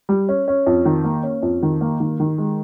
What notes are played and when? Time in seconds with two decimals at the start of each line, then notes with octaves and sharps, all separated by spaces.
0.09 G3
0.29 C#4
0.48 C#4
0.67 F2
0.85 D#3
1.04 A#3
1.23 C#4
1.43 F2
1.63 D#3
1.81 A#3
2.00 D#3
2.20 D#3
2.38 G#3